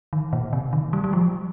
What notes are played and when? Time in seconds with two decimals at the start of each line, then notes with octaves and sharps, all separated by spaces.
0.13 D#3
0.33 A#2
0.53 C3
0.73 D#3
0.93 G3
1.04 G3
1.13 F3